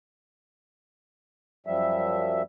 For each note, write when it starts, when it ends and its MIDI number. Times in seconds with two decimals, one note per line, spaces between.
1.67 2.42 42
1.67 2.42 53
1.67 2.42 55
1.67 2.42 76